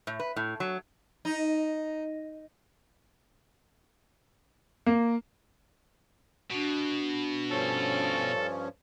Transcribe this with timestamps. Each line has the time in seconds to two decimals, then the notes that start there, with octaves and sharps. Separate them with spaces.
0.07 A2
0.20 B4
0.36 A2
0.60 F#3
1.25 D#4
4.86 A#3
6.51 B2 D4 F#4
7.50 G2 F3 C#4 A4